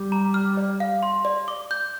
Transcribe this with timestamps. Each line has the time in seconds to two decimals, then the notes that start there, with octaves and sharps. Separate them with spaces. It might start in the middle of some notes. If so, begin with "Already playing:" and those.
Already playing: G3
0.12 A#5
0.34 F6
0.57 D5
0.80 F5
1.03 C6
1.25 D5
1.48 D6
1.71 G6